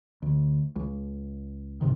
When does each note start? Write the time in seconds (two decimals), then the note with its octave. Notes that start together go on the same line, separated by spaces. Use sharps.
0.22 D2
0.76 C#2
1.81 C2 G#2 C3 D#3